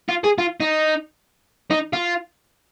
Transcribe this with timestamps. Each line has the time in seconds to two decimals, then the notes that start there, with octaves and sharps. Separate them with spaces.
0.09 F4
0.24 G#4
0.38 F4
0.60 D#4
1.71 D#4
1.93 F4